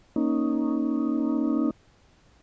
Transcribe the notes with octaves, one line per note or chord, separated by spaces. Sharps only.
A#3 C#4 D#4